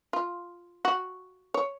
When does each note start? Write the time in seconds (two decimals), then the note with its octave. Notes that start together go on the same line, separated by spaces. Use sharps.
0.13 F4
0.85 F#4
1.54 C#5